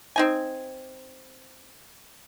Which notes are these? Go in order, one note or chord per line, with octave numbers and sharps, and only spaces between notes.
C4 D#4 G#5